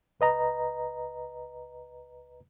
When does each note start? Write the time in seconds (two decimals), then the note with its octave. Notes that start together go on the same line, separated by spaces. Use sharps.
0.20 C#2 B4 D#5 A#5